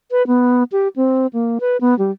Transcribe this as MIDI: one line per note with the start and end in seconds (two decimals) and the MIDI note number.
0.11 0.26 71
0.27 0.63 59
0.72 0.88 67
0.96 1.27 60
1.33 1.58 58
1.60 1.77 71
1.81 1.97 59
1.99 2.11 55